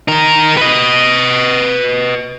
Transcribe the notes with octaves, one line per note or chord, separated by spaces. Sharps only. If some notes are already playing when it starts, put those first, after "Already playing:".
D#4 A#4
B4 D#5